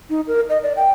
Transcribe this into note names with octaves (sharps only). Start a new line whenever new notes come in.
D#4
A#4
D#5
D5
G5